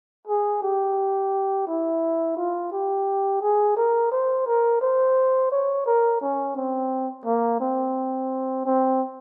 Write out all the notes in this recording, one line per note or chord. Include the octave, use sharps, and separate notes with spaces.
G#4
G4
E4
F4
G4
G#4
A#4
C5
A#4
C5
C#5
A#4
C#4
C4
A#3
C4
C4